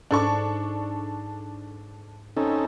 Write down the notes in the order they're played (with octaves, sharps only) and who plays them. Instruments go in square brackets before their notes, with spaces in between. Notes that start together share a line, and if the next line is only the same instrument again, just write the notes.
[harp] G#2 D6 [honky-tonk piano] D4 A4 C#6
[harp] C4 [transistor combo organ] C#4 D#4 A4